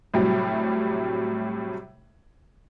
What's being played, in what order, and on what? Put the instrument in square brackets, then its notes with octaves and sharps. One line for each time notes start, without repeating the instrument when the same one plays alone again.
[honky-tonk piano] A2 C3 F#3 G3